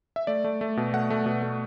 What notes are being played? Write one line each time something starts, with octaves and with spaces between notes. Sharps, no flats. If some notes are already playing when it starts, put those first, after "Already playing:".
E5
A3 D5
A3
A3
B2
A3 F#5
A3
B2
A3